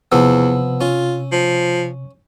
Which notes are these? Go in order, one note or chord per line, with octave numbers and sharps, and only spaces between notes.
E2 C3 F3 B3 E6
C#4 F4
F3